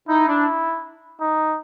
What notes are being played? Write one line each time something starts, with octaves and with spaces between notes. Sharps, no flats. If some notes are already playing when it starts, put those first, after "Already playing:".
D#4 E4
D4
D#4